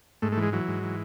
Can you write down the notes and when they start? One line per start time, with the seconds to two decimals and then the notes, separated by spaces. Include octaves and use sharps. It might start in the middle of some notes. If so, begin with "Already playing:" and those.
0.22 G#2 A3
0.32 A3
0.37 E3
0.43 G#3
0.52 E3 F#3
0.68 G#2
0.83 E3